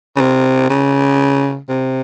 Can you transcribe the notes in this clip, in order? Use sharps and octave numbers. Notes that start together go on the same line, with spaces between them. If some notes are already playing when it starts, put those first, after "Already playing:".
C#3
C3
C#3
C3